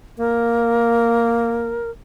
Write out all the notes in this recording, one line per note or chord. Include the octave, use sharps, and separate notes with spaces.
A#3 A#4